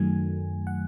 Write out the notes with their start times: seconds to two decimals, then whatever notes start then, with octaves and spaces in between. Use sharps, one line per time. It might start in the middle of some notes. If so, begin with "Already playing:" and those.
Already playing: F#2 D#3 F#3 A3 G#5
0.67 F#5